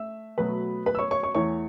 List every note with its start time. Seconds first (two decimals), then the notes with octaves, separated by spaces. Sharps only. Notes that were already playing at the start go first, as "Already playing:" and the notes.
Already playing: A3 E5 E6
0.38 B2 F#3 A3 B4 B5
0.86 B4 B5
0.95 E6
0.99 C#5 C#6
1.11 C#5 C#6
1.23 C#5 C#6
1.35 E2 E3 A3 C#5 C#6